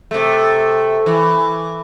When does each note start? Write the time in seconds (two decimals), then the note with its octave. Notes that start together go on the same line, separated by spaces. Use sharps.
0.11 C3 A3
1.06 E3